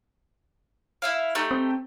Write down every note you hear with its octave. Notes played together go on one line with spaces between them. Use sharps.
E4 E5 F5
A3 D#4 G4
C4